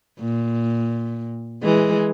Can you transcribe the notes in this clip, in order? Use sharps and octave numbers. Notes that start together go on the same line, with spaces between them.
A#2
E3 G#3